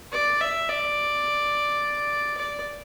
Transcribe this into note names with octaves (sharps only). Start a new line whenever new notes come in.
D5
E5
D5
D5